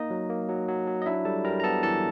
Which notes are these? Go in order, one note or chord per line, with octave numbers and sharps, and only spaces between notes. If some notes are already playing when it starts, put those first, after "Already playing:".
Already playing: A#3 D#4 D#5
F#3
A#3
F#3
F#3
F#3
D#5
D4 E4 E5
G3 A4 A5
G3 A#4 A#5
A#5
B3 A4 A5
E3 A4 A5